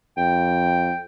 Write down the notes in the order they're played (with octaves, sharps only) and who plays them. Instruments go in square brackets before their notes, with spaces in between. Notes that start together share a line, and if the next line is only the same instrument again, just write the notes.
[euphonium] F2 [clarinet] G5